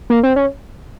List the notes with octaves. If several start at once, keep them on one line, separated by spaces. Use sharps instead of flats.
A#3
C4
C#4